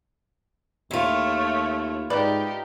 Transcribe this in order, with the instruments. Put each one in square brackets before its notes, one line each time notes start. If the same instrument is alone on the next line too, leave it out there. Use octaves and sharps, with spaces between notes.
[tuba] D#2 [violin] A3 C#5 [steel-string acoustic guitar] E4 F4
[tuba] G#2 [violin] D#4 G4 [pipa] B4 D5